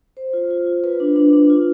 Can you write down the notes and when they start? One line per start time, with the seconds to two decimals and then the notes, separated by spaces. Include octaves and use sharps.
0.17 C5
0.33 F4
0.50 F4
0.67 F4
0.84 B4
1.00 D4
1.16 D4
1.33 D4
1.50 F4